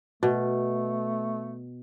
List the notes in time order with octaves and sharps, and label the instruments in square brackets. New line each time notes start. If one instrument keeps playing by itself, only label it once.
[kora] B2 [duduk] A3